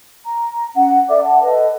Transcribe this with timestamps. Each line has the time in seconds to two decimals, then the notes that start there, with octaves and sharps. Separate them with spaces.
0.25 A#5
0.76 C#4 F#5
1.09 A4 D5 E5 D6
1.21 F#5 A5
1.43 A4 B4 D#5